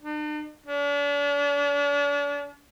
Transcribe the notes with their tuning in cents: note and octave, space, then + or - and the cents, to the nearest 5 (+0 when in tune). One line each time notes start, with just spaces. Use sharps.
D4 +45
D4 -40